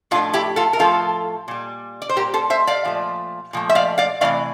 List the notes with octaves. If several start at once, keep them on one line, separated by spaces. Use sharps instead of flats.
A2 F3 A3 D4 F4
E4 G4
F4 A4
A#4
A2 F3 A3 F4 A4
A#2 G3
D5
C5
A#2 G3 G4 A#4
A4 C5
C5 E5
D5 F5
A#2 F3 A3
A#2 F3 A3
E5
D5 F5
D5 F5
C3 E3 A3 D5 F5